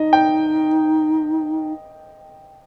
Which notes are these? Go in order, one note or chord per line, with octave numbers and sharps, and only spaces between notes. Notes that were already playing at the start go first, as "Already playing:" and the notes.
Already playing: D#4 D#5
G5